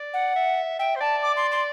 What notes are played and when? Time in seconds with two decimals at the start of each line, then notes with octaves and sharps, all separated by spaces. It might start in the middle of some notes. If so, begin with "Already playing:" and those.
Already playing: D5
0.14 F#5
0.36 E5
0.79 E5 G5
0.96 C5
1.00 D5 A5
1.22 D6
1.36 C6
1.52 C6